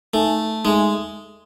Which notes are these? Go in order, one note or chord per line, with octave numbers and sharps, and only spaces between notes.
A3 D#4 A4 E5 G#5
G#3 D#4 A4 E5 G#5